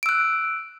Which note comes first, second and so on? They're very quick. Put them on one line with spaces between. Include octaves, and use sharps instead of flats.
D7 E6 F#6